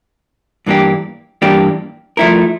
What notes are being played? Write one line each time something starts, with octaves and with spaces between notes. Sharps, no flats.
G2 E3 A#3 D4 G4
G2 E3 A#3 D4 G4
F3 A3 E4 A#4